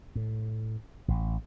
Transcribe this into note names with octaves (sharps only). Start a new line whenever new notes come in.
A2
A1